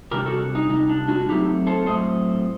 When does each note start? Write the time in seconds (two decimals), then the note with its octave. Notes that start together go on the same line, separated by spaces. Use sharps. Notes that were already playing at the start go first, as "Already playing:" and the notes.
0.11 C3 G3 D4 G4 A#4
0.26 F#4 A4
0.55 D#4
0.70 C3 G3 D4 D#4
0.89 D4
1.08 D4 F#4
1.28 A2 F#3 A3 C4 D#4 G4
1.67 A4 C5
1.86 A2 F#3 A3 C4 C5 D#5